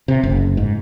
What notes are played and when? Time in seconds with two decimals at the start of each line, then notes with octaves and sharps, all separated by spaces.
0.08 C3
0.23 F#1
0.57 G#2